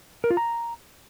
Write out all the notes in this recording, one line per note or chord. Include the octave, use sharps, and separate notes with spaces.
A#4
F4
A#5